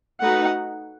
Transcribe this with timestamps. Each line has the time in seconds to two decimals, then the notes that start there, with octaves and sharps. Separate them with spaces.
0.20 A3 D#4 F#4 B4 F#5